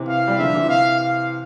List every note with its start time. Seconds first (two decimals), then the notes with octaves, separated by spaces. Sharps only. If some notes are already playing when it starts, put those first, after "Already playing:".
Already playing: C3 E3
0.08 F5
0.27 G3
0.39 D3 F3 E5
0.54 C3 E3
0.69 F5
1.00 F5